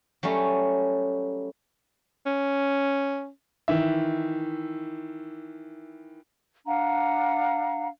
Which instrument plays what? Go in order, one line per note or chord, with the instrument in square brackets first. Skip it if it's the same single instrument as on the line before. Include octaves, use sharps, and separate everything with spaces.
[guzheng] F#3 G3 A3 C#4
[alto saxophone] C#4
[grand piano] D#3 E3 E5
[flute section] D4 F5 F#5 A#5